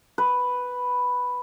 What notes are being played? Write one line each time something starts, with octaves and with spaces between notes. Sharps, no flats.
B4